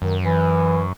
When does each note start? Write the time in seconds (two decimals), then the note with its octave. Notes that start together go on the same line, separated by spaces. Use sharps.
0.02 F#2 D#3
0.23 E3